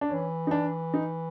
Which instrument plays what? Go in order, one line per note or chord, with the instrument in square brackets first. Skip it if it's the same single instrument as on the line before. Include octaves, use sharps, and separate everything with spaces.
[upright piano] D4
[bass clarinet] E3 [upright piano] C#4
[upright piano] D#4
D4
D#4